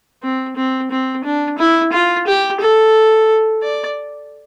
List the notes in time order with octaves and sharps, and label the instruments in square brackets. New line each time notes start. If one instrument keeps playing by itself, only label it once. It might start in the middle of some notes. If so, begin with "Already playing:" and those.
[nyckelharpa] C4
C4
C4
D4
E4
F4
G4
A4
D5